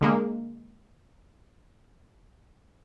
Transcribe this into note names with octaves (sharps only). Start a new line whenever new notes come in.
D3 G#3 A#3